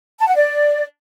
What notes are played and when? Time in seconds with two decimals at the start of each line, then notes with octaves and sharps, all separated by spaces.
0.20 A5
0.28 F#5
0.36 D5